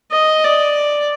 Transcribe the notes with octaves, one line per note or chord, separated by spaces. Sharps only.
D#5
D5